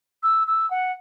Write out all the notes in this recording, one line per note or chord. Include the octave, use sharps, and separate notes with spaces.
E6
E6
F#5